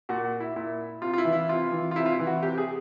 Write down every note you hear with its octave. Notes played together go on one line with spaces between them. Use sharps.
A#2 F#4
F#4
E4
A#2 E4
C3 F4
F4
E4
E3
E4
C3 F4
E3
F4
C3 E4
F4
E4
E3
F#4
C3 G4
G#4